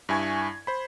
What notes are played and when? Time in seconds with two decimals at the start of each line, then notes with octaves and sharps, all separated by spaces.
0.09 G2 E4 G#5 C#6 G#6
0.67 C5 B5